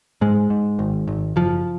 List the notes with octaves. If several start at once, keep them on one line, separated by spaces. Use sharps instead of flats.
G#2 G#3
G#2
G#1
G#1
F#1 F3